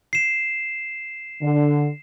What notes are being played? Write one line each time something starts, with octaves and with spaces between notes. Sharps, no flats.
C7 E7
D3